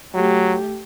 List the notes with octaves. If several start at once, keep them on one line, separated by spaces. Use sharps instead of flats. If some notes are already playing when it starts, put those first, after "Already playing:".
F#3 A3 G4